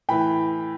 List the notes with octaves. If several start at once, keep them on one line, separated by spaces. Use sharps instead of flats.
A2 E3 G5 B5